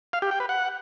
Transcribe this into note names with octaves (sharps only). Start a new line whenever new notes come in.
F5
G4
G5
B4
F#5